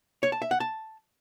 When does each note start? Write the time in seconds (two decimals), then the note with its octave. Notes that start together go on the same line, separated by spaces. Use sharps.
0.23 C#5
0.32 A5
0.42 E5
0.51 F#5
0.60 A5